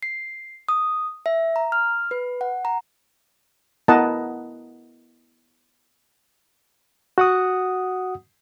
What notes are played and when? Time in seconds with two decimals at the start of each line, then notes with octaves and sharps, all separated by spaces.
0.03 C7
0.69 D#6
1.26 E5
1.56 A#5
1.72 F6
2.11 B4
2.41 F#5
2.65 A#5
3.88 B3 E4 A#4 D#5 F#5 A5
7.18 F#4 F#5 D#6